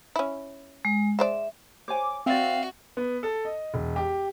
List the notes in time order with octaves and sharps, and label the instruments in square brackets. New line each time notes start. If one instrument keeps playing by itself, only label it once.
[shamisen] C#4 E4
[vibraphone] G#3
[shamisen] G#3 C5 D5 [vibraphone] E5
[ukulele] C5 C#5 G#5 [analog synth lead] D6
[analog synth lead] C4 [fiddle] F#4 [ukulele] D5 E5 [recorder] F5
[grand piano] B3
A4
D#5
E1
G4